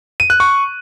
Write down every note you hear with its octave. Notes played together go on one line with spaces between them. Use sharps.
D#7
F#6
C#6